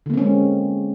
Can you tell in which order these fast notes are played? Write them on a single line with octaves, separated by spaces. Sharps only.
D3 A#3 C4 C#4 G#3